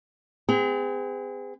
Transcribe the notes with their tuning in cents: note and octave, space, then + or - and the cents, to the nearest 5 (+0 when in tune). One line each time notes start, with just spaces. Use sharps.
C4 -45 G#4 -30